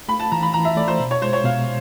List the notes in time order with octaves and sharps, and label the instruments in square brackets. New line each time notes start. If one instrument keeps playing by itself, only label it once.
[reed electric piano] A3 [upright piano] B5
[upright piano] A5
[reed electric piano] E3 [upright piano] A#5
[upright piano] B5
[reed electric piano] E3 [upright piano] A#5
[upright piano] E5
[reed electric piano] A3 [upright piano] D5
[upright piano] C5
[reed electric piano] B2
[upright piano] C#5
[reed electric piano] G#3 [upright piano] C5
[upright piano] C#5
[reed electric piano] B2 [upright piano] F5